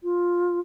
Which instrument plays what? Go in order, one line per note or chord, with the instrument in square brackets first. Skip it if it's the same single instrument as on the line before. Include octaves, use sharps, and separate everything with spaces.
[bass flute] F4